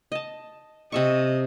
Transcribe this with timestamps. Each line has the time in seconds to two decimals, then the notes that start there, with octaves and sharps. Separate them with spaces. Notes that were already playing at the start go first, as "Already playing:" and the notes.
0.12 D#5 A5
0.92 C3 A4 D#5 C#6